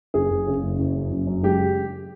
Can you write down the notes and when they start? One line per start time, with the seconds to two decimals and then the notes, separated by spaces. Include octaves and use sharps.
0.14 F#1 G#4
0.30 F#1
0.47 C#3
0.63 F#1
0.79 F#1
0.95 F#2
1.11 F#1
1.27 F#2
1.43 G#3 G4